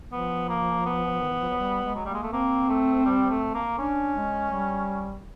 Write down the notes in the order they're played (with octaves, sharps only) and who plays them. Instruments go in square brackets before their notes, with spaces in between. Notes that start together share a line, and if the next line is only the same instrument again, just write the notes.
[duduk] F3 [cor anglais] B3
[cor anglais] A#3
B3
[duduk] D#3
E3
F3
F#3
G3
G#3
[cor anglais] F#3
[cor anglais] G3 [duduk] A#3
[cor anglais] G#3
A3
[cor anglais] A#3 [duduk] C4
[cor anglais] A3
G3
A3
A#3
[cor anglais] C#4 [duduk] D4
[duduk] G#3
G3